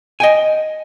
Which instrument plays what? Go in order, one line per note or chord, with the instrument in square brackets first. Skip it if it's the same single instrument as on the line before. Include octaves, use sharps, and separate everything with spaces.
[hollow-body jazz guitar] D#5 G5 G#5